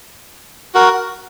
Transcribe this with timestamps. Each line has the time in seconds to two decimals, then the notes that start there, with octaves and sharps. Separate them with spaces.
0.75 F#4 A#4